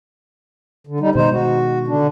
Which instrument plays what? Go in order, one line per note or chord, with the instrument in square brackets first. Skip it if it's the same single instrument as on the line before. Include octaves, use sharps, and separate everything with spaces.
[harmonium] D3
G3 D#4
[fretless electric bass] B2 D#3 G#3 [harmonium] D#4 C5
[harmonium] F#4
D3 D4